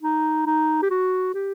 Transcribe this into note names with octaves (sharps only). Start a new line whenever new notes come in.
D#4
D#4
G4
F#4
G4